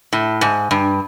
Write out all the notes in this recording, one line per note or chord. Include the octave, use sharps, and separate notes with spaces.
A2
G#2
G2